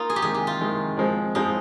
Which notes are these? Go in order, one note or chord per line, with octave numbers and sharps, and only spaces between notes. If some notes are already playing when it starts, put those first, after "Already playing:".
Already playing: A#3 D#4 F4
G#4
G4
C3 D#3 G#3 G#4
G4
F4
C3 D#3 G#3
F3 G#3 C4
F3 G#3 C4 D#4